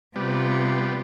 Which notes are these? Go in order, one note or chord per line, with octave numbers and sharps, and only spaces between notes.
C3 G3 B3 F4